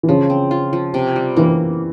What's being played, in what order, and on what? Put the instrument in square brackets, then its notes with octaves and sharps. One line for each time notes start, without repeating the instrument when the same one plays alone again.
[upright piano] E3
[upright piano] C#3 [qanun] F3
[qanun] C4
F4
F3
C3
G3
[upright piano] E3 [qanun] A#3